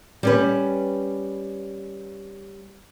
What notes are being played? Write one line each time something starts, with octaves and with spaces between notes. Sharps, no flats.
G3 C#4 B4